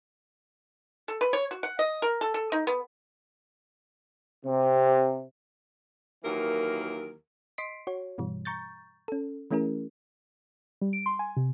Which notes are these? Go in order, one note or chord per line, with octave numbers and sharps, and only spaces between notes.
A4
B4
C#5
F#4
F#5
D#5
A#4
A4
A4
D#4
B3
C3
D#2 E3 F#3 A#3 A#4
D#5 C6 B6 C7 D7
F#4 C#5
G2 B2 E3 G3
A#5 C#6 G6 A6
C#4 A4
E3 A3 C#4 E4 G#4 A#4
G3
D7
C6
G#5
C3